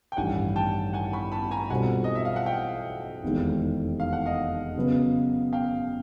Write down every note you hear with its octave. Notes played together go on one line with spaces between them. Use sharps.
G5
A1 G2 D#3 F#5 G#5
G5 A5
F#5 G#5
B5 C#6
A5 B5
G#5 A#5
B1 B2 G3 C4 F4 F#5 G#5
D#5
E5
F5
F#5
F5 G5
F1 E2 C3 D#3 G#3
F5
F#5
D#5 F5
C#3 F#3 B3
F5 G5